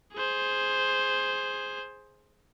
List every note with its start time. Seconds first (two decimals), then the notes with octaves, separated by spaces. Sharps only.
0.13 G#4 C5